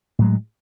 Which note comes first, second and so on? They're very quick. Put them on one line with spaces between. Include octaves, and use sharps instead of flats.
A2 F#3 G#3